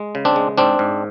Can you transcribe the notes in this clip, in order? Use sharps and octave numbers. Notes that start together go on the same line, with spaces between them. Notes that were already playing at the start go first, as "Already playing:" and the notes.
Already playing: G#3
C#3
C4 D4
G#3
G#2 C4 D4
G#2